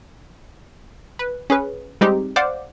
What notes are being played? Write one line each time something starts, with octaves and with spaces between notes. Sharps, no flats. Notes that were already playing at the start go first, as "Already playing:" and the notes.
B4
C#4 G#4 B4
G3 G#3 C4 D#4 G4
C5 D5 F5 F#5 D6